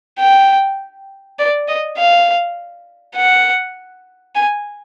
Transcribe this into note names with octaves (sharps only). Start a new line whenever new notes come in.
G5
D5
D#5
F5
F#5
G#5